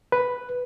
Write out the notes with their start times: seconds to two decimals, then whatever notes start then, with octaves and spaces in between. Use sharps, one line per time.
0.12 B4